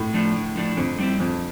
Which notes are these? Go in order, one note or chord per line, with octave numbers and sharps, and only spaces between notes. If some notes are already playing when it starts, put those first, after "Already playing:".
Already playing: A2
F3 A3 D4
D3
F3 A3 D4
F2 D3
G3 C4 E4
F2 D3